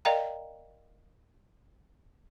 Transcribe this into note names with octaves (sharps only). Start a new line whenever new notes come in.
A#4 D5 D#5 F5 G5 A#5